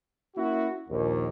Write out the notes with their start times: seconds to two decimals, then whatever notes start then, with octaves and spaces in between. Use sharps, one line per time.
0.37 A#3 C#4 E4 F#4
0.89 A#1 D#2